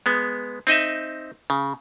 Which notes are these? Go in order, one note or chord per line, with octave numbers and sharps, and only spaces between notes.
G#3 B3
C4 D#4 D#5 E5
C#3